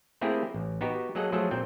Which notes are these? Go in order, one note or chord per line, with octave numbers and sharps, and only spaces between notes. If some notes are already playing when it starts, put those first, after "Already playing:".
A3 A#3 C4 E4 G4 G#4
A1
B3 D#4 F#4 G4
F#3 A#3 G#4 A4 D#5 F#5
F3 F#3 A3 G#4 A4
A#2 C4 G5